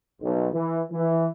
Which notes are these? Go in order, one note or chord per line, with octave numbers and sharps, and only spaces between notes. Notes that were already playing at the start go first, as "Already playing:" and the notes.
B1
E3
E3